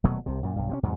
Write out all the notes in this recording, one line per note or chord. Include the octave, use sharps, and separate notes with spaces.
D#1 B2 F#3 A3
C2 C3
F#2 A#2
B1 G2
C3 A3 C#4
E2 G#2 C3 F#3